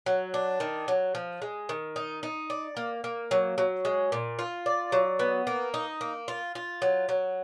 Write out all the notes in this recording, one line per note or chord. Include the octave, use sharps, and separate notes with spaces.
F#3
D4
D#3
F#3
F3
G#3
D#3
D#4
D#4
D5
A#3
A#3
F#3
F#3
G#3
A#2
F4
D5
F#3
B3
A#3
D#4
A#3
F4
F4
F#3
F#3